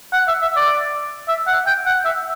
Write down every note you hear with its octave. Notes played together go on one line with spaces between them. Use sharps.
F#5
E5
E5
D5
E5
F#5
G5
F#5
E5